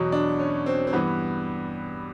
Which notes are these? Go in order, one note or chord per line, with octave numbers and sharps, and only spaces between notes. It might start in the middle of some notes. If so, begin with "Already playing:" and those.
Already playing: E2 B2 F#3
D4
C#4
C4
C4
G2 E3 B3